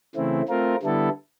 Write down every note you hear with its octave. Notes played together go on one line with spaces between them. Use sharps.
C#3 E3 A3 C4 E4
A3 C4 F4 A#4
D3 G3 B3 E4 A4